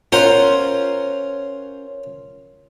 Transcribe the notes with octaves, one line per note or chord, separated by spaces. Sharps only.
C#4 F4 A#4 C5 F#5